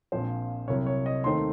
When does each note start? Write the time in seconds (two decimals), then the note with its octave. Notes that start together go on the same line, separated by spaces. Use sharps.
0.12 A#1 A#2 F3 C4 C5
0.68 C2 C3 F#3 C#5
0.86 C#5
1.06 D#5
1.24 D#2 D#3 A3 C4 D#4 C6